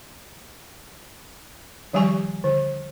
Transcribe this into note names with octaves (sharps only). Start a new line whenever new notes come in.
D#3 F3 G3 G4 G#5 C#6
D3